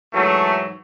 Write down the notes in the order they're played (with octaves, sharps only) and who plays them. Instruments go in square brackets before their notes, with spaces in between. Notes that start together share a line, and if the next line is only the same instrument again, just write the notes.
[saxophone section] G#2 E3 F#3 [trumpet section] A3